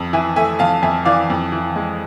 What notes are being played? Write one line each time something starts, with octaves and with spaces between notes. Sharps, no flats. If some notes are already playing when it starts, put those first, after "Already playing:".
Already playing: F2
E3 E5 G#5
A3 E5 G#5
F2 F5 A5
F2 E5 G#5
E3 D5 F5
F2
E3
G#3